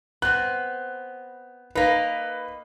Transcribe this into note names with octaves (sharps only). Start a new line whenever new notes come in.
B3 C4 F#6
A#3 D#4 B4